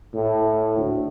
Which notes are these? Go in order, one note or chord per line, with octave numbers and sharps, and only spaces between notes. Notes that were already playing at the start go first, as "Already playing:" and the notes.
A2
D2